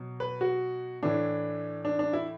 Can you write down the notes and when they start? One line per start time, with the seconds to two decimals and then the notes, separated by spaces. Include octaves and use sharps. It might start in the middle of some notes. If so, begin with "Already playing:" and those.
Already playing: B2 F#3
0.20 B4
0.41 F#4
1.03 A2 E3 D4
1.85 D4
1.99 D4
2.13 E4